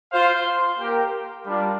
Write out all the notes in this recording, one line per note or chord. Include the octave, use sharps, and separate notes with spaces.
F4 C5 F5
A#3 G4 A#4 G5
G3 D4 F4 A#4